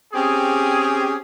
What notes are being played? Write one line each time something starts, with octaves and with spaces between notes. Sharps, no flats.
C4 C#4 G4 G#4